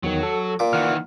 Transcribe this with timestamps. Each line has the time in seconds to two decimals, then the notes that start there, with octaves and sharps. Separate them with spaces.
0.03 E2 D#3 F#3
0.23 A4
0.59 A#2 D6
0.73 D#3 E3 F#5 F6